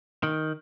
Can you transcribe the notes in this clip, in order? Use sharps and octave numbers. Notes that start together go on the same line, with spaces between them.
D#3